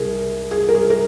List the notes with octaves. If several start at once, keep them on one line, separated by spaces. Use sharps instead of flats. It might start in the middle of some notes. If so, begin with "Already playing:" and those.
Already playing: C2 G#4 A#4
G#4
A#4
G#4
A#4